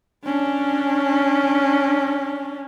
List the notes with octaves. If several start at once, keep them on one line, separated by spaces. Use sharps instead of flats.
C#4 D4